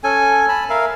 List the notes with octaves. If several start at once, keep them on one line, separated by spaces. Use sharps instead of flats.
C#4 A4 G#5
A5 B5
A#4 E5 F5